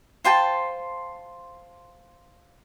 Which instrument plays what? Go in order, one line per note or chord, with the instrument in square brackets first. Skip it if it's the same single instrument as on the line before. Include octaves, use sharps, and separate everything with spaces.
[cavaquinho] F4 C5 G5 A5